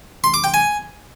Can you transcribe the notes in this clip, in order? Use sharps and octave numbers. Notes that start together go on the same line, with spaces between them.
C6
D6
G5
G#5